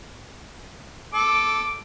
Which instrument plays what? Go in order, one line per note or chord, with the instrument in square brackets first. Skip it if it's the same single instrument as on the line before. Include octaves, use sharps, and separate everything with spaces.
[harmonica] A4 [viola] D6